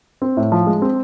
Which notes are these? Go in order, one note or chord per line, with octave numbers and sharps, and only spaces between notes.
C4
A2
F3
G#3
C4